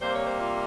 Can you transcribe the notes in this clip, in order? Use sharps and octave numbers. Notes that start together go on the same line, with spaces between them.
C3 G3 A#3 C5
C#5
C5
F4